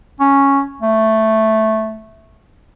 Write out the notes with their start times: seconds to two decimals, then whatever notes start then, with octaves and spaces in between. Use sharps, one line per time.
0.20 C#4
0.82 A3